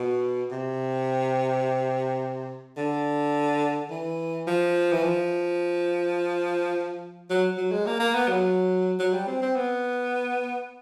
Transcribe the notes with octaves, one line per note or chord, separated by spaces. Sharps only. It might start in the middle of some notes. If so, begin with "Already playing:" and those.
Already playing: B2
C3
D3
E3
F3
E3
F3
F#3
F#3
G#3
A#3
A#3
B3
F#3
F#3
G3
C4
C4
B3